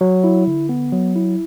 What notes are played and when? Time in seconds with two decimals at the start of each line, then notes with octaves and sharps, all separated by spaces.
0.01 F#3
0.24 E4
0.47 D3
0.69 B3
0.92 F#3
1.16 E4